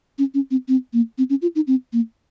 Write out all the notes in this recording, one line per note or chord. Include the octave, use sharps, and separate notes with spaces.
C#4
C#4
C4
C4
A#3
C4
C#4
F4
D#4
C4
A#3